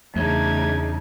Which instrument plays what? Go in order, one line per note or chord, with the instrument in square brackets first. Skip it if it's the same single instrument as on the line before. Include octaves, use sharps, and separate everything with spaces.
[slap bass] E2 [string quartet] C#3 D4 D#4 [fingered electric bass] A3 [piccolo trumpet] G#6